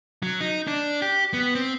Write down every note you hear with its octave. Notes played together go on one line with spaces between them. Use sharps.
F#3
D#4
D4
G4
B3
C4